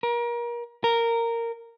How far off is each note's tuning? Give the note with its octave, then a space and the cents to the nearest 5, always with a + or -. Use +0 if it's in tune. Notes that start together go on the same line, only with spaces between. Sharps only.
A#4 +30
A#4 -10